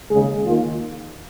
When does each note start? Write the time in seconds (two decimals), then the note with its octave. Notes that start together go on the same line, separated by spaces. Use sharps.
0.11 D#2 C#3 G#3 G#4
0.45 D#2 D#3 A#3 F4